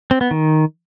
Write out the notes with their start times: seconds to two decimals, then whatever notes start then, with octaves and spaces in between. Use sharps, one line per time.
0.11 C4
0.21 B3
0.31 D#3